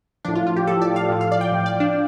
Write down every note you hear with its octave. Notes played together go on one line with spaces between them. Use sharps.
A2 F3 D4
F4
F4
G4
A2 F3 A4
D5
F5
A2 F3
F5
D5
G5
A2 F3
D5
D4